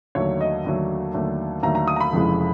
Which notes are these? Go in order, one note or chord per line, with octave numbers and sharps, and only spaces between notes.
D#2 D3 F#3 A3 C#5
D#5
D#2 D3 F#3 A3
D#2 D3 F#3 A3
D#2 D3 F#3 A3 A#5
A#5
D#6
A#5
B5
F1 F2 C#3 E3 G#3